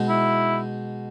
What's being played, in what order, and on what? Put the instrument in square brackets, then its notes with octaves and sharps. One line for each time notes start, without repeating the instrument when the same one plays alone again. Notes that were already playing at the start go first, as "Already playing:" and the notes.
Already playing: [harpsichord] B2 G#3 D#4
[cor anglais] E4